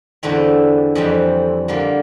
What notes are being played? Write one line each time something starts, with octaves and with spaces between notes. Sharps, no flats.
E2 D3 A3 C4 E4
F2 E3 G3 C4
D3 G3 A#3 F4